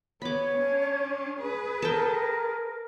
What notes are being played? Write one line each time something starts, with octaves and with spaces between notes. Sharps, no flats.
B3 C#5 B5 D6
C#4 D4
G#4 B4
A4 A#4 G5